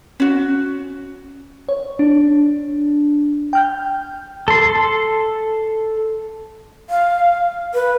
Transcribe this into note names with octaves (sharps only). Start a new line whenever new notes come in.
C#4 F#4
C#5
D4
G5 F6 G6
A4 C6
F5
B4